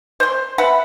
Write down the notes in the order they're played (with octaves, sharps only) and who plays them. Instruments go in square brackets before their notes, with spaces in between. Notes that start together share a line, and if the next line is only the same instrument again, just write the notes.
[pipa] C5 C6
B4 E5 F#5 B5